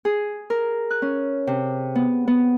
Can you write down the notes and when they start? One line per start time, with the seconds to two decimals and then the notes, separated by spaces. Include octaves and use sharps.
0.05 G#4
0.50 A#4
0.91 F#6
1.02 C#4
1.47 C3
1.95 B3
2.28 B3